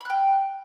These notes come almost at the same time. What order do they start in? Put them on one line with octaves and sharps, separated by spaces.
B5 F#6 G5